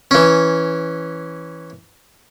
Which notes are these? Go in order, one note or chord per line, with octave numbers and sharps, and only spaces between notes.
E3 C#4